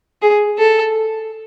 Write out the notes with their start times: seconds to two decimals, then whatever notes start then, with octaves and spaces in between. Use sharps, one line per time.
0.22 G#4
0.58 A4